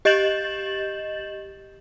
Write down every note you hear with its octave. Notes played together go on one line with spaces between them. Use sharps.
G4 D#5 G6 A6 E7 F#7